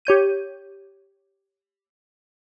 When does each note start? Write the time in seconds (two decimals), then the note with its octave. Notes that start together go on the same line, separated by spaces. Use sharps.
0.05 G4 C#5 G6 D#7